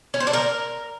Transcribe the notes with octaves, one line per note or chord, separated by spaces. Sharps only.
C#4
C5
D4
A#4